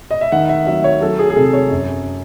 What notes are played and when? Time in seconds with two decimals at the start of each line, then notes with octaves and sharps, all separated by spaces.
0.11 D#5
0.21 E5
0.32 D#3 F#5
0.49 E5
0.66 F#3 E5
0.84 C#5
1.01 F#3 A4
1.19 G#4
1.30 G#4
1.36 C3 A4
1.53 C#5
1.71 F#2